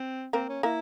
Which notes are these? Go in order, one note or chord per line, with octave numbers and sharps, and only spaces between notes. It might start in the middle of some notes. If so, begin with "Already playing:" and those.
Already playing: C4
A#3 C4 A#4
C#4
A#3 E4 A#4